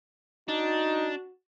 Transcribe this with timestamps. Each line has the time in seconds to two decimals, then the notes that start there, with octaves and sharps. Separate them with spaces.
0.48 D4 D#4 F#4